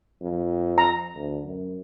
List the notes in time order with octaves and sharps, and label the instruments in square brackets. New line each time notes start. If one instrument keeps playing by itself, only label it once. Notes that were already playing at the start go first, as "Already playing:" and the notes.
[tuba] F2
[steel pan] A#5
[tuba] D2
F#2